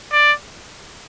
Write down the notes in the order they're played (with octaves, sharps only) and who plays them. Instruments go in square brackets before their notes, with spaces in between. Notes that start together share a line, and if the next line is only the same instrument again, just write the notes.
[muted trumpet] D5